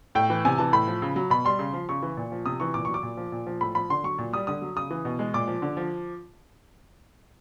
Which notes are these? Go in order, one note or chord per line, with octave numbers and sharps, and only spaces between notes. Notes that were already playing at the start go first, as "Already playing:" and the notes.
A2 G5
E3
C3 G#5
E3 A5
A2 B5
F3
C#3
F#3
B2 B5
G3 C6
C#3
F3
C#3 C#6
E3
A#2
F3
C3 D#6
E3 C#6
A#2 D6
F#3 C#6
D6
A#2
F3
A#2
F3
A2 B5
F3 B5
D3 C6
F#3 C#6
A#2
G3 D#6
D3 D#6
F#3
C#3 D#6
E3
B2
G#3
A#2 D6
F3
D3
F3